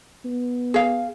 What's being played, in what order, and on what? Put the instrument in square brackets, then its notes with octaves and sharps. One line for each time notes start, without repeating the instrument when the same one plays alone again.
[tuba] B3
[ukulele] G#4 F5